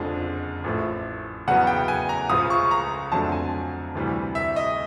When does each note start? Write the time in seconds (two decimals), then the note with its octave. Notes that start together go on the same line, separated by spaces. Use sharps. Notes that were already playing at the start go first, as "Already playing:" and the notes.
Already playing: F#1 F2 D3 F3 G#3
0.64 A1 A2 F3 A3
1.48 E2 C#3 F#3 B3 F#5
1.67 G5
1.88 G#5
2.09 A#5
2.29 C#2 C#3 F3 D#6
2.50 C#6
2.71 A#5
3.12 F2 D3 F#3 A3 C4 A5
3.32 G#5
3.95 D2 C3 E3 G3
4.35 E5
4.56 D#5